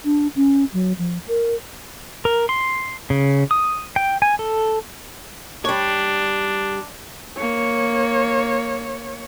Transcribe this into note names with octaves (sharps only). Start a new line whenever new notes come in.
D4
C#4
F#3
F3
A#4
A#4
C6
C#3
D#6
G5
G#5
A4
G3 D4 C#5
A#3 C#5